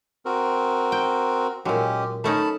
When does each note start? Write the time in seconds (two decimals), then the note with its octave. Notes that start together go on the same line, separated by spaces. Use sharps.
0.26 C4 F#4 A#4
0.92 G5
1.65 A#2 F#3 G#3 C#4 G4
2.24 A3 C#4 D#4 A5 B5